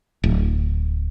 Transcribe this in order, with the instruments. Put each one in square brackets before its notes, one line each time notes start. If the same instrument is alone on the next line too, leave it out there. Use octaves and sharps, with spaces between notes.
[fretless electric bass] D1